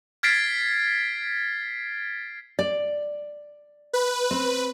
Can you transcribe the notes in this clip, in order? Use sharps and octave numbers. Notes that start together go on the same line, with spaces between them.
F6 G#6 A6 B6 C7 D7
D5
B4
C4